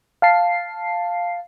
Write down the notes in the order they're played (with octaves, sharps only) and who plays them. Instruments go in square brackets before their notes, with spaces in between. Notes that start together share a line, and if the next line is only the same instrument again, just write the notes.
[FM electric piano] F5 A5 C7